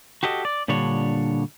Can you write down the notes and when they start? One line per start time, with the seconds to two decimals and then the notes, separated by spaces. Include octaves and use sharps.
0.23 F#4 G4 A4 D#5
0.45 D5
0.68 A#2 D3 G3 D4 C#5